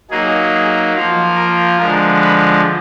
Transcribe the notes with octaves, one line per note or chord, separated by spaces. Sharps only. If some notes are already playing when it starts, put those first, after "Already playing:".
F#3 A#3 D#4 G#4
G#4
F3 A#3 F4
A#4
D3 F3 G#3 A#4
B4